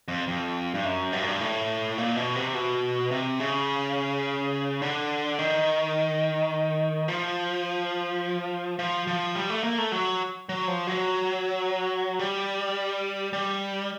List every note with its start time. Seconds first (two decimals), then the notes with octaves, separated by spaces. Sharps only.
0.08 F2
0.28 F2
0.74 G2
0.85 F#2
1.12 G2
1.20 F#2
1.27 G2
1.41 A2
1.98 A#2
2.17 B2
2.36 C3
2.54 B2
3.11 C3
3.40 C#3
4.82 D3
5.38 D#3
7.08 F3
8.79 F3
9.07 F3
9.35 G3
9.50 A3
9.64 A#3
9.78 A3
9.92 F#3
10.49 F#3
10.68 F3
10.87 F#3
12.19 G3
13.33 G3